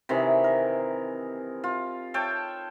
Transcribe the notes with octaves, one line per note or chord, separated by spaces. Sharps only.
C3 D#3 E3 G#4
A#4
F4
A4 C#5 G5 A5